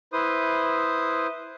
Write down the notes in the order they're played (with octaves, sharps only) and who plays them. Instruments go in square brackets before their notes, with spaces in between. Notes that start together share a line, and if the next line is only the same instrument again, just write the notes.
[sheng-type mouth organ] E4 B4 C5 D#6